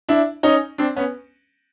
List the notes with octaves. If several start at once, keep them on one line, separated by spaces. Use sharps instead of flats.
D4 E4
C#4 D#4
C4 D4
B3 C#4